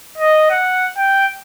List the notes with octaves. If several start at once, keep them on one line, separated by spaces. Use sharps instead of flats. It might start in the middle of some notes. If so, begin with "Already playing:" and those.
D#5
F#5
G5